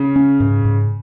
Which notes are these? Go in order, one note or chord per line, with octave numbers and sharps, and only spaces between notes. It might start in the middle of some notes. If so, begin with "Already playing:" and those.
Already playing: C#3
C#4
G#2
G#2